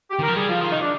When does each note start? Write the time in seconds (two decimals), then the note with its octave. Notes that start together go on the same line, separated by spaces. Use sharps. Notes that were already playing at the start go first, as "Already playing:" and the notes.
0.11 G4
0.19 D#3 A#4
0.28 F3
0.36 G3 G#4
0.49 F3 F4
0.61 D#3 F4
0.72 D#4
0.81 D4